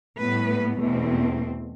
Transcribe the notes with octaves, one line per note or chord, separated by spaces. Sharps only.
A2 G3 B3 B4
E2 B2 A3 C4